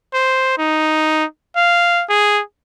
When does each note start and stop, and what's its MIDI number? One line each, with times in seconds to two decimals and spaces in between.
0.14 0.57 72
0.58 1.25 63
1.56 2.04 77
2.10 2.42 68